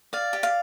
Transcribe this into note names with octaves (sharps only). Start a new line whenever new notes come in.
D5 F5
G4
F5